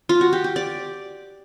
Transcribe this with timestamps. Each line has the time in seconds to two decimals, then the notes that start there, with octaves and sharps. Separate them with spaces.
0.09 F4
0.21 F#4
0.33 G4
0.44 G4
0.56 D5